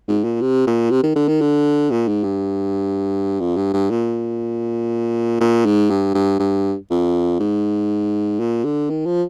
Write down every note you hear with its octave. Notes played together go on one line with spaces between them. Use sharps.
G#2
A#2
C3
A#2
C3
D#3
D3
D#3
D3
A#2
G#2
G2
F2
G2
G2
A#2
A#2
G#2
G2
G2
G2
F2
G#2
A#2
D3
D#3
F3